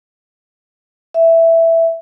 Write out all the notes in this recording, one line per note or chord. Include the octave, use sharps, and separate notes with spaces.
E5